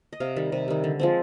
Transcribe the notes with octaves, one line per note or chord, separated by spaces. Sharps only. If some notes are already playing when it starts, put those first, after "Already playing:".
D#5
C3 F5
D#3 G3
C3
D#3 G3
D3
F3 G#3 C4